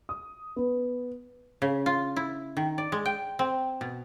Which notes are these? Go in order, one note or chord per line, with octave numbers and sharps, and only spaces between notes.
D#6
B3
C#3
F4
E4
D#3
D5
G#3
G5
C4
B2